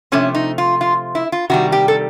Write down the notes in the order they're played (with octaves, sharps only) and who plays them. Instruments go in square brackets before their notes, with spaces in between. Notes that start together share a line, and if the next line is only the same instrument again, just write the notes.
[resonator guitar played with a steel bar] C3 F3 A3 C#4
D#4
F4
F4
E4
F4
C3 D#3 G3 F#4
G4
A4